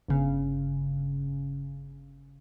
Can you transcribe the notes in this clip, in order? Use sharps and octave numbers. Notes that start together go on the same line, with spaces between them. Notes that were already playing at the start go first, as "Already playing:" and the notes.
G1 C#3